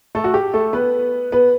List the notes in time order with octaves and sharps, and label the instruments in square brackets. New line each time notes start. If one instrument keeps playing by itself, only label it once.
[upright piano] A3 A4
F#4
G4
A3 A4
B3 B4
B3 B4